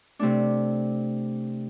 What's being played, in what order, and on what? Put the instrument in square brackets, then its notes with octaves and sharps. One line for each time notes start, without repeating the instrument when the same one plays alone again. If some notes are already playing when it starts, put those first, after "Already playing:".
[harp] C3 A3 D4